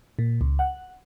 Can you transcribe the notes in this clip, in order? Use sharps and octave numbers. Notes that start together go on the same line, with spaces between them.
A#2
C#2
F#5